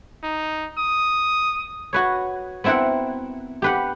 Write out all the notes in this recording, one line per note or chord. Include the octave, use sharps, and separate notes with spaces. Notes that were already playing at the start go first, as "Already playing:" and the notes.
D#4
D#6
F#4 B4 C#5
B3 C4 E4 A#4 F#5
G4 B4 F#5